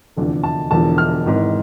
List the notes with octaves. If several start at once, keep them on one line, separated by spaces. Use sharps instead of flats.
F1 E2 D3 F3
A5
E1 E2 D3 F3 A5
F6
G#1 G#2 E3